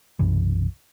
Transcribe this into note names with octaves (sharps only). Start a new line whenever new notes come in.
B1 F#2 C3 E3